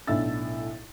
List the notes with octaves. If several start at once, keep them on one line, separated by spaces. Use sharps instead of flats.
B1 A2 D4 E5 E6 A6